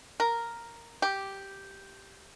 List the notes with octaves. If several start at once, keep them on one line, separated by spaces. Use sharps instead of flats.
A#4
G4